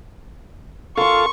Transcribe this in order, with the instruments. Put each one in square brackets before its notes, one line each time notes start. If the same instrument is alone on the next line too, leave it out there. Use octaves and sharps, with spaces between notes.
[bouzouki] F4 [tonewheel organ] A4 F5 [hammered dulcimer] A#4 C6 [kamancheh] C#6